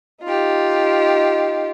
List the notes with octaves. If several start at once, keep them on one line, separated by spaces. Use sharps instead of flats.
D#4 F4 G4